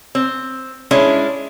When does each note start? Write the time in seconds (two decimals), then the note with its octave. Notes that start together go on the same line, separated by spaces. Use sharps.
0.15 C4
0.91 G#3 C#4 D4 E4